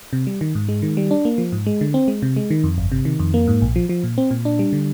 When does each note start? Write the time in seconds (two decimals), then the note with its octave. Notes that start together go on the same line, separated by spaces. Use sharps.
0.13 C3
0.27 G3
0.41 D#3
0.55 G#2
0.69 G#3
0.82 D#3
0.97 G3
1.11 D4
1.25 A#3
1.38 F3
1.52 G#2
1.66 G#3
1.81 D3
1.94 C4
2.08 G#3
2.22 C3
2.36 G#3
2.51 D#3
2.64 F2
2.78 G1
2.92 C3
3.05 D#3
3.20 F2
3.34 A#3
3.48 G#2
3.62 A#1
3.76 F3
3.89 F3
4.04 A#2
4.18 C4
4.31 A#2
4.45 D4
4.59 G3
4.73 D3